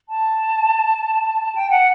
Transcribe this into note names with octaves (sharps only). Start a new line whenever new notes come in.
A5
G5
F#5